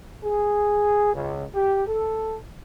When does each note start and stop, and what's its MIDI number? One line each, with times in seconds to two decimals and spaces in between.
0.23 1.10 68
1.14 1.44 37
1.54 1.83 67
1.87 2.36 69